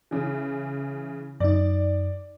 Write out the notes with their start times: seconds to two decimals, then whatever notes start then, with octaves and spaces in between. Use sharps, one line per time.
0.11 C#3 E3
1.40 F#2 D#4 D5